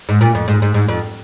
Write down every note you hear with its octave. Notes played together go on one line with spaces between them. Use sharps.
G#2
A#2
F2
G#2
G#2
G#2
F2